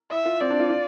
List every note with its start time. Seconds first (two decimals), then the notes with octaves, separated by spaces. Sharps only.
0.11 E4 E5
0.25 F4
0.40 C4 D5
0.50 D4
0.60 F4
0.70 F4